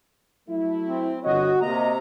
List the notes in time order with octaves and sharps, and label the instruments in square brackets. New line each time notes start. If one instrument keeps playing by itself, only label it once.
[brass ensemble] F#3 A3 E4
[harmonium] C4
[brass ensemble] G1 C#5 D#5 [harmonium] F#4
[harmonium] C3 A#5 [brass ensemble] A#3 D#5